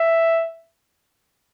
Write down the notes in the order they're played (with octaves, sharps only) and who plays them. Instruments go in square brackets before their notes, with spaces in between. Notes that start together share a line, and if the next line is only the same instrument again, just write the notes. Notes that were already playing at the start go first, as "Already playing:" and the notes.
Already playing: [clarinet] E5